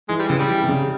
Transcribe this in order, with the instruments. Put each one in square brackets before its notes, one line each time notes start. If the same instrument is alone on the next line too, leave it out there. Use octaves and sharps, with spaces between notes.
[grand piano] E3 [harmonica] G#3
[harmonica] G3
[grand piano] C#3 [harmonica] E3
[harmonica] G3
[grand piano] E3
C3
C#3